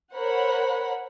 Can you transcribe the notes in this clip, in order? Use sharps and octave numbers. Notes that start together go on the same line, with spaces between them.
A#4 C5 C#5 F#5 B5